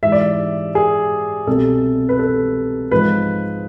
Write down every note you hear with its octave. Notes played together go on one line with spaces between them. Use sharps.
G#2 E3 E5
D5
E5
G#4
C2 B2 A4
B4
A4
G#2 F3 B4